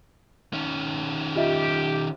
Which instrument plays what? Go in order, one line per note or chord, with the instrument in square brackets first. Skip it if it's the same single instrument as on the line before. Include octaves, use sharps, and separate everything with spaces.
[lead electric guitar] D#3 C#4
[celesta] F4 D#5 E5 [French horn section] G4